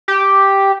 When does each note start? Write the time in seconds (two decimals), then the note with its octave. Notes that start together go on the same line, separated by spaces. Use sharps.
0.08 G4